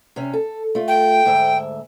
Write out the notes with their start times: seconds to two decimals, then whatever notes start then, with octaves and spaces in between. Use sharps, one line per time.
0.16 C3 C#4
0.33 A4
0.75 A3 F4
0.88 G5
1.25 D2 G#2 E5